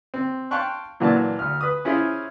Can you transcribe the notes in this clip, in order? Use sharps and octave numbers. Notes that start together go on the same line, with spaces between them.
C4
F5 G5 A5 C6 C#6 F#6
A#2 E3 F#3 A#3 D4 A5
D2 F6
B4 D#6
C#4 E4 F4 G#4 C5